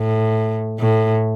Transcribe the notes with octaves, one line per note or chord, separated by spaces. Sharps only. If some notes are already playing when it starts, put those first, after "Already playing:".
Already playing: A2
A2